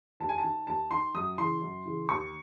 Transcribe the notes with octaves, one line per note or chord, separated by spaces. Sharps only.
D#2 A5
G#5
A5
D#3
D#2 A5
D#3 C6
F#2 D#6
C#3 E3 C6
F#2
C#3 E3
D#2 C#6